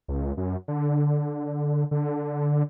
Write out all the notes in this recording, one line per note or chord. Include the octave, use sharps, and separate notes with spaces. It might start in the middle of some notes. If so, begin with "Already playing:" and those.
C#2
F#2
D3
D3